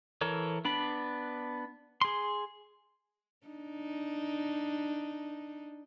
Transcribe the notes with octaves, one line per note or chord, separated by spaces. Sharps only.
E3 A4 A#4 C#5
B3 D4 B5
G#4 C6
D4 D#4